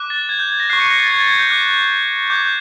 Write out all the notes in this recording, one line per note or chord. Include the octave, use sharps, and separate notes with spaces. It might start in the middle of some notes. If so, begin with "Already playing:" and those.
Already playing: D6 F#6
A6
G#6
G6
G#6
A#6
C#6 F#6 C7
C#7
A#6
A6
G#6
A6
G#6
G6
D6 F#6
D6 G6 G#6
G6